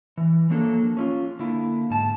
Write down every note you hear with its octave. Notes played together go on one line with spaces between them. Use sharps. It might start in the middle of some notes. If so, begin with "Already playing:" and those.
E3
F3 F#3 A#3 D4 A4
C#4 E4 F4
D3 A#3 E4
G#2 A5